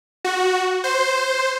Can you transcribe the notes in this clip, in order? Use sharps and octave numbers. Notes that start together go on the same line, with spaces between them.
F#4
C5